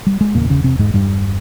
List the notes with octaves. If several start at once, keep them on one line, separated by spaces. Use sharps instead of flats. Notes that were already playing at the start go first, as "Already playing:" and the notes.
G3
G#3
E1 E2 A#2 C#3 A#3
C#3 C#4
C3 C4
G#2 G#3
G2 G3